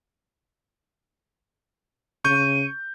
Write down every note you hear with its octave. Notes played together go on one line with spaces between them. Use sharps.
C#3 C#6 G6 D#7